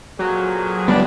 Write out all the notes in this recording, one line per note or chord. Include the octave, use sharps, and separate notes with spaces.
F2 A#2 F#3 G#4
C#2 G2 B2 G3 B3 D4